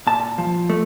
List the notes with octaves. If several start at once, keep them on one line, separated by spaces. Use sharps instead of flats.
A#2 A5
F3
A3